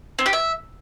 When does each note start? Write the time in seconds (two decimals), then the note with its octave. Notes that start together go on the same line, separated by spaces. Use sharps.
0.19 C4
0.26 G4
0.33 E5